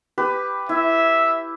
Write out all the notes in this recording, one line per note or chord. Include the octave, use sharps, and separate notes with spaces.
G4 B4
E4 E5